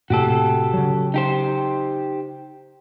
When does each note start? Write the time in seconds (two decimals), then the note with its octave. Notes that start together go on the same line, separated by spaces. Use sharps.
0.10 A2 C3 A#3 F#4 G4 A4
0.73 C#3 F#3
1.14 D#4 G4 C5